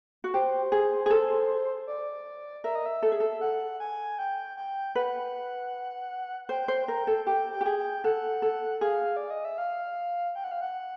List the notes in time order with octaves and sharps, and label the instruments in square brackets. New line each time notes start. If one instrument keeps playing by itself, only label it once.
[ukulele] F#4
[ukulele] G4 [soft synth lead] C5
[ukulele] G#4
G#4
A4
[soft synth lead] D5
[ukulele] A#4 [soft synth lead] E5
[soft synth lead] D#5
E5
[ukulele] A4
G#4
A4
[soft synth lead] F#5
G#5
G5
G5
[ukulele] B4 [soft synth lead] F#5
[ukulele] C5 [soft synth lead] G5
[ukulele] C5
A#4
A4
[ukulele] G4 [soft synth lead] G5
[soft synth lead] G5
[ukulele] G4
G#4
[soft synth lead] G5
[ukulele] A4 [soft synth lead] F#5
[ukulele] A4
[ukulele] G#4 [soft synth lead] F5
[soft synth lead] D5
D#5
E5
F5
G5
F#5
F5
F#5